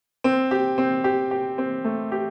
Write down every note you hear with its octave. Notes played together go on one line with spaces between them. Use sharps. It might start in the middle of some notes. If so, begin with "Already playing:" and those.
C4
G4
C4
G4
G4
C4
A3
G4